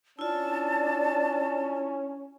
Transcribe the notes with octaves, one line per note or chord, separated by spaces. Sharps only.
C#4 D4 E4 F4 A5